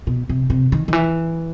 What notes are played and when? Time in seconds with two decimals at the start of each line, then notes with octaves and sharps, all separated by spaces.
0.07 B2
0.29 C3
0.50 C3
0.72 D#3
0.88 D#3
0.93 E3